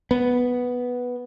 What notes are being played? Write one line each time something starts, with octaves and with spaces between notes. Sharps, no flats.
B3